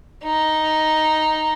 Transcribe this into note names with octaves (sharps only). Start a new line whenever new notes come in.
D#4